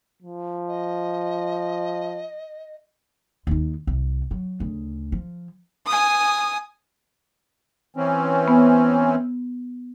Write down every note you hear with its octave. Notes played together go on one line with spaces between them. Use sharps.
F3
D#5
D#2 D#4
C2
F#3
D2 C#3
F3
G#5 D#6
E3 C4 C#4
B3